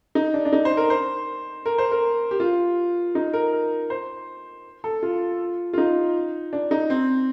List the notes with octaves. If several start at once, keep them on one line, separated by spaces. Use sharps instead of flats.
D#4
D4
D4
D#4
C5
A#4
C5
A#4
C5
A#4
G4
F4
D#4
A#4
A#4
C5
A4
F4
F4
D#4
D4
D#4
C4